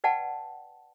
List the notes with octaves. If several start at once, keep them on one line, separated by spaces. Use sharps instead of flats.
B4 D5 F#5 G5 A5